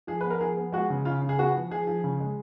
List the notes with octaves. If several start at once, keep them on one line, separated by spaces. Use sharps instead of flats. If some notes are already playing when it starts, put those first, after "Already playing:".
F3 G#4
B3 B4
A#4
F3 G#4
B3
G#3 F#4
C#3
C#3 F4
C#3
G#4
B3 F#4
F3
F3 G#4
F3
C#3
G#3